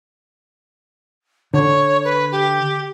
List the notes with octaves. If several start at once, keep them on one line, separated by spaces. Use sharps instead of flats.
D3 C#5
B4
G4